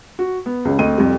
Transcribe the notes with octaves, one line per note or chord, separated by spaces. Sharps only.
F#4
B3
C#2 C#3
D2 C4 D#5 D#7
C2 F2 G3